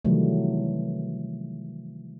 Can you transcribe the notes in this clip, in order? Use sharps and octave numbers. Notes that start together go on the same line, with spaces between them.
C3 D#3 E3 F#3 G3 A3